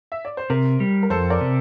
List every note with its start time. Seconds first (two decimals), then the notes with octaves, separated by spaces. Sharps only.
0.12 E5
0.25 D5
0.37 C5
0.50 C3 A#4
0.80 G3
1.03 A#4
1.10 F2 A4 C5
1.30 A#4 D5
1.41 C3